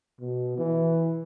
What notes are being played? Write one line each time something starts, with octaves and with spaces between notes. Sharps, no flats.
B2
E3